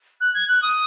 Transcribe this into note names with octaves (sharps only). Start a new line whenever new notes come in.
F#6
G#6
F#6
D#6